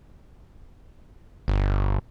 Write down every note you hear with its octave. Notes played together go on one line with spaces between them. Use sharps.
G1